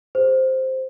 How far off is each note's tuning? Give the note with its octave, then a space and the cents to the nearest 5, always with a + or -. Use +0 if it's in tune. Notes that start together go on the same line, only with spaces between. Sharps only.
G#4 -25 C5 +0